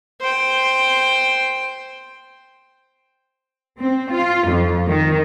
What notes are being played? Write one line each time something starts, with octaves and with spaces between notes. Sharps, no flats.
C5 G5
C4
F4
F2
D#3